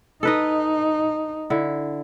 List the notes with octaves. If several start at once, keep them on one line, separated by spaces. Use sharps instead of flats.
D#4 A4 B4 D#5
D3 E4